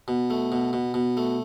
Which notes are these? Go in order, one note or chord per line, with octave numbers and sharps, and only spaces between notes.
B2
A3
B2
B2
B2
A3